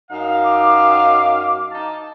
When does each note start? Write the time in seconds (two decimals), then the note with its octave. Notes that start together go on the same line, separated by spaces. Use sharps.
0.10 F#2 D#4 F5
0.44 D6
1.72 D#4 A5